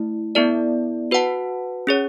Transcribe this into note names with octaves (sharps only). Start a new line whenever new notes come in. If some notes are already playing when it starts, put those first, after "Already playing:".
Already playing: A3 E4
B3 E4 A4 D5
F#4 B4 F#5 A5
C#4 G#4 C#5